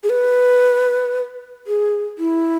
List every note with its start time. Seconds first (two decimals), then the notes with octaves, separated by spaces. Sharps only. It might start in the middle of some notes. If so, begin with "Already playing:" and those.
0.03 G#4
0.10 B4
1.67 G#4
2.18 E4